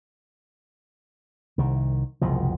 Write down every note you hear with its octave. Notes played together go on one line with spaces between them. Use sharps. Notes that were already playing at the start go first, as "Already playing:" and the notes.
C2 D#3
F#1 C2 B2 F3